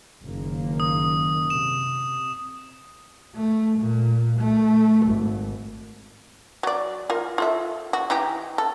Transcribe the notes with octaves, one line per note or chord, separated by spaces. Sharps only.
F#1 D#3 A#3
D#6
C3 E7
A3
A#2
A3
G#1
F#3 D5
F4 A#4
F4 A4 E5
F#4
E3 D#4 G4
A4